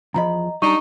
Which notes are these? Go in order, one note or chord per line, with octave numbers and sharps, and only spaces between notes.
E2 F3 D#5 A#5 B5
G3 D4 D#4 A#5 C#6